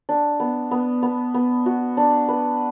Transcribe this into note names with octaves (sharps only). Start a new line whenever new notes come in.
D4
B3
B3
B3
B3
F#4
D4
B4